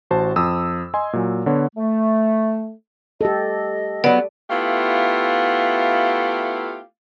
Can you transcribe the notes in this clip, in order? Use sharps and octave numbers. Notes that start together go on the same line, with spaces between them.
A1 F#4 C5 A5
F2 D#6 E6
D#5 G#5 C6
A#2 F#3
D3 B3 C#5
A3
G4 A4 D#5
F#3 B3 D5
A3 B3 E4 F4 G4 F5